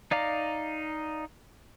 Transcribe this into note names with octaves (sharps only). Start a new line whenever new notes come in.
D#4 D5 F5 A#5